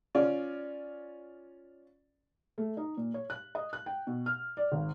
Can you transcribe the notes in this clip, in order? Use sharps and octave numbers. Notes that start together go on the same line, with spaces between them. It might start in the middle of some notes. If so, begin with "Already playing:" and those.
C#4 F4 D5
A3
D#4
A#2
C#5
F#6
D#5
F#6
G5
B2
F6
D5
G#1